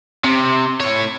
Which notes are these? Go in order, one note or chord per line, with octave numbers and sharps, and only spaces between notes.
C3
A2 C#5